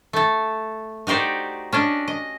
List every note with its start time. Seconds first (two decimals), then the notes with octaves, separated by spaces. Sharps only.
0.13 A3 A4
1.07 D#4 F#4 G4 C5 D5
1.73 C#4 D4 D#5
2.08 D#5